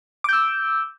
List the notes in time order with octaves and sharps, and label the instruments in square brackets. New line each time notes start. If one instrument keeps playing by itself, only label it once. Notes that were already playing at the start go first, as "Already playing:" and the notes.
[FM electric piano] D6
G6
E6